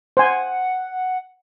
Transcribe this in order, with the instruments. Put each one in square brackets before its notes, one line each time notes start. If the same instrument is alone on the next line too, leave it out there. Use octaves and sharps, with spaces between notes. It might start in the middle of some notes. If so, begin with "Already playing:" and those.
[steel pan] C5 G#5 [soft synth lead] F#5